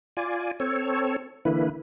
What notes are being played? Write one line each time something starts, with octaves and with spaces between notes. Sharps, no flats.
F4 D5 G#5
C4 A4 C#5
D3 E3 A#3 E4 B4